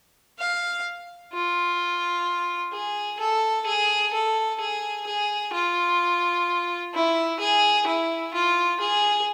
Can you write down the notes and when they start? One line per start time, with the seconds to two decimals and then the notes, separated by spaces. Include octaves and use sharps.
0.39 F5
1.33 F4
2.73 G#4
3.19 A4
3.66 G#4
4.13 A4
4.60 G#4
5.07 G#4
5.53 F4
6.94 E4
7.40 G#4
7.87 E4
8.33 F4
8.80 G#4